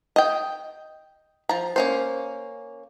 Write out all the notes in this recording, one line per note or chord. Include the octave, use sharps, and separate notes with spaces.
D#5 G5
F3 A#5
A#3 C#4 C5